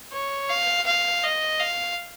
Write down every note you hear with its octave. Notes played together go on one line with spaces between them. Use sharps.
C#5
F5
F5
D#5
F5